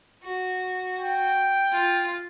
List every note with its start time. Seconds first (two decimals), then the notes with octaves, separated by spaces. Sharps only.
0.24 F#4
1.00 G5
1.72 F4